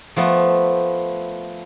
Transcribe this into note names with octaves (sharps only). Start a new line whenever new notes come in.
F3 A3 B3